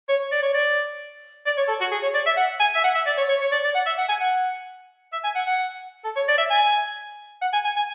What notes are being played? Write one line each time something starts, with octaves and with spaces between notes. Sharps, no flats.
C#5
D5
C#5
D5
D5
C#5
A4
F#4
G#4
C#5
D5
E5
F#5
G#5
E5
F#5
E5
D5
C#5
C#5
C#5
D5
D5
F#5
E5
F#5
G#5
F#5
E5
G#5
F#5
F#5
A4
C#5
D5
E5
G#5
F#5
G#5
G#5
G#5